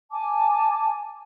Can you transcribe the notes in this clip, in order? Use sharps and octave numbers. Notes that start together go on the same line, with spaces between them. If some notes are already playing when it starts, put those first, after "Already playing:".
G#5 A5 D6